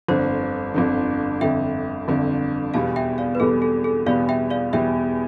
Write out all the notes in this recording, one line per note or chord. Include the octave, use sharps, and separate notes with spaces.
G1 F2 D3 C5
G1 F2 D3
G1 F2 D3 E5 G5
G1 F2 D3
E2 B2 G3 B3 F5 A5
E5 G5
D5 F5
B4
E2 B2 G3 B3 A4
A4
A4
E2 B2 G3 B3 D5 F5
E5 G5
D5 F5
E2 B2 G3 B3 E5 G5